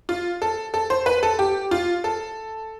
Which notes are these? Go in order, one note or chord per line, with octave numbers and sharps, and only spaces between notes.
F4
A4
A4
C5
B4
A4
G4
F4
A4